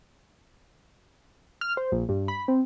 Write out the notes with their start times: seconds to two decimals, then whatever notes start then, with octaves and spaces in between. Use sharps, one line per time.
1.61 F6
1.77 C5
1.92 A#1
2.09 G2
2.28 B5
2.48 C4